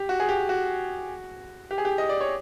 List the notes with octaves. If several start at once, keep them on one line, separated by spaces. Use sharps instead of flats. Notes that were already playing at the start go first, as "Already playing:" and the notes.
Already playing: G4
F#4
G#4
G4
F#4
G4
G#4
G4
D#5
D5
C#5